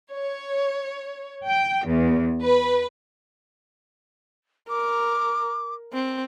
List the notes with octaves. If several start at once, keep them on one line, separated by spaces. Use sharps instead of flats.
C#5
G5
E2
B4
A#4 D6
C4